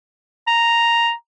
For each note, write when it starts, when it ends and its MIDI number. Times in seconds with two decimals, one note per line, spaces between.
0.47 1.13 82